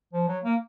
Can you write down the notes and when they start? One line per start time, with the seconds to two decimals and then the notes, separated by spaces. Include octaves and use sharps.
0.13 F3
0.28 F#3
0.44 A#3